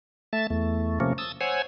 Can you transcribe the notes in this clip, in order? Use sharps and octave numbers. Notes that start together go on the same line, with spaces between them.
A3 E5 A5 A6
E2 A3
C3 F3 A3 A#3 C#4
A5 D#6 E6
C5 C#5 F#5 G#5 E6 G#6